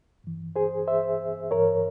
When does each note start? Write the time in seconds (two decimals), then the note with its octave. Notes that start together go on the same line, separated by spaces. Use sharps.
0.24 G2 E3
0.56 G#4 C5
0.88 C5 E5
1.51 G2 E3 A#4 C#5